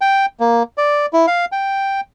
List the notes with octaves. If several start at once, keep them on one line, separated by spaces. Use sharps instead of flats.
G5
A#3
D5
E4
F5
G5